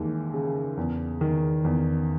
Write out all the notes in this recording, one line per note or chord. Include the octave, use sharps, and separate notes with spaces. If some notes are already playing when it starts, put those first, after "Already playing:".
Already playing: D#2 E3 G#3
C#3
E2
D#3
E2